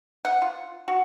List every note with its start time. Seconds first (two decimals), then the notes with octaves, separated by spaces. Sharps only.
0.25 F#5
0.42 F4
0.88 F#4